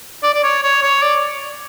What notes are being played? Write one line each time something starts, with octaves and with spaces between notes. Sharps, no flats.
D5
D5
C#5
C#5
C#5
D5